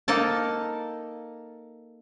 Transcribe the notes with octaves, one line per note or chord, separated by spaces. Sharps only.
A#3 D#4 A4 A#4 A5